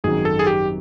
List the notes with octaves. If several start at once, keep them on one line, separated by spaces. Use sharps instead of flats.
G#1 F#2 D#3 F#3 G#4
A4
G#4
G4